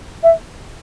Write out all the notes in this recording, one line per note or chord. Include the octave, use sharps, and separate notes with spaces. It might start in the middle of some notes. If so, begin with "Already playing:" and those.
E5